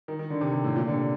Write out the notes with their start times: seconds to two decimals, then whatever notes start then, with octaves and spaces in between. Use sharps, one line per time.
0.08 D#3
0.19 D#3
0.30 D3
0.41 C3
0.53 C3
0.64 A2
0.75 A#2
0.87 D3
0.92 C3